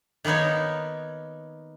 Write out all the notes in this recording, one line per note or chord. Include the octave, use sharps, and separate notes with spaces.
D#3 A#3 B3 D#4 C#5